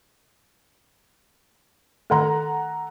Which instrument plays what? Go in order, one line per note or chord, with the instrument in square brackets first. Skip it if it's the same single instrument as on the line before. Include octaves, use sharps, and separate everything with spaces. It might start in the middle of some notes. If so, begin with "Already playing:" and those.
[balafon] D#3 A3 [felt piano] A4 F#5 A#5